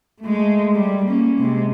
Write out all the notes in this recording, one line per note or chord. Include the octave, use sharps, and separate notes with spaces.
G#3 A3
G3
A#3 C#4
C3 G#3